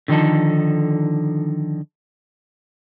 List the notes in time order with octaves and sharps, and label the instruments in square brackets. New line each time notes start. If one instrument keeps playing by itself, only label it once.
[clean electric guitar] D3 D#3 F3 D#4 A4